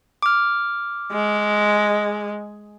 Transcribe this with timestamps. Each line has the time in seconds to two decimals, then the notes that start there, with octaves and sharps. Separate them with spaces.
0.23 D6 F6
1.12 G#3